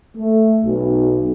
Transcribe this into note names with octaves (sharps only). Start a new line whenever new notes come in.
A3
B1